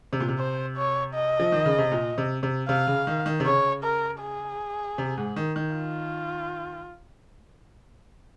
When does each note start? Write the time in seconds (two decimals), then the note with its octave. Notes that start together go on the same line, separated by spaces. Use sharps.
0.13 C3
0.20 A#2
0.28 C3
0.39 C5
0.77 C#5
1.15 D#5
1.40 F3
1.52 D#3
1.66 C#3
1.79 C3
1.92 A#2
2.18 C3
2.43 C3
2.68 C3 F5
2.87 C#3
3.07 D#3
3.26 D#3
3.40 C3
3.45 C#3 C#5
3.84 A#4
4.21 G#4
4.98 C3
5.17 G#2
5.36 D#3
5.56 D#3
5.75 F4